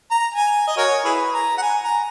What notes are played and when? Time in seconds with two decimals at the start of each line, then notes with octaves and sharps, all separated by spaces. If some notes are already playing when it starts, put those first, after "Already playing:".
0.11 A#5
0.34 G#5
0.68 D#5
0.77 F#4 A#4 C#5
1.05 E4 G#4 B4
1.34 A#5
1.58 F#5
1.62 G#5
1.84 A#5